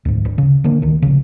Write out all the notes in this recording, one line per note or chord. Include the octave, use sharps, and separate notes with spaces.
D2 G#2
D1
C#3
D3 A#3
D2 D#3
A#1 C#3